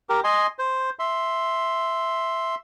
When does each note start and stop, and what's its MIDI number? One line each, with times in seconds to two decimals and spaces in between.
0.09 0.21 67
0.09 0.21 70
0.24 0.47 75
0.24 0.47 80
0.24 0.47 84
0.59 0.90 72
0.99 2.55 76
0.99 2.55 84